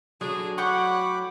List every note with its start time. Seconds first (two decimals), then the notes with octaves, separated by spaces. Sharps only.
0.21 D3 F#3 D4 G#4
0.58 A2 C#5 F#5 G5 B5 C#6 D6